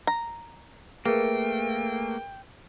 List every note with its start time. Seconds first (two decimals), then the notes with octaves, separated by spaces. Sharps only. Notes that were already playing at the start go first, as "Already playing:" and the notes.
0.07 A#5
1.06 A3 A#3 G#4 A#4 B4 G5